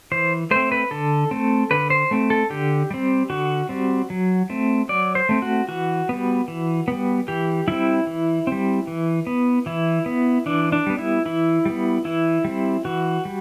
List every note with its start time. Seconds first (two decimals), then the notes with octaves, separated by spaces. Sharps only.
0.12 E3 C5
0.51 A3 C4 C5
0.72 B4
0.91 D3 A4
1.31 A3 C4
1.71 D3 B4
1.90 C5
2.11 A3 C4
2.30 A4
2.50 D3 G4
2.91 G3 C4
3.30 D3 F#4
3.69 G3 C4
4.10 F#3
4.50 A3 C4
4.89 F#3 D5
5.15 C5
5.29 A3 C4
5.42 F#4
5.69 E3 F#4
6.09 G3 B3
6.48 E3
6.88 G3 B3
7.28 E3 G4
7.68 G3 C4 E4
8.07 E3
8.47 G3 C4
8.87 E3
9.27 B3
9.66 E3 E4
10.06 B3
10.46 E3 D4
10.72 D4
10.87 G3 B3
10.99 E4
11.26 E3 E4
11.65 G3 B3
12.05 E3 E4
12.45 G3 C4
12.85 E3 F#4
13.25 G3